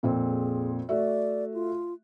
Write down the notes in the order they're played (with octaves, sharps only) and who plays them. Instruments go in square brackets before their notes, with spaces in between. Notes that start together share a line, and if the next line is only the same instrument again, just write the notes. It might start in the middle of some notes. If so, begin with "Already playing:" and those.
[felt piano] F2 A#2 C4
[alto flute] G#4
[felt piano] A3 F#4 E5 [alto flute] D5
[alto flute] F4